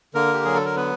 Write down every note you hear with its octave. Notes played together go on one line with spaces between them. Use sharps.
D3 A#3 A#4
G4
F#3 G#4
A4
A#4
B3 B4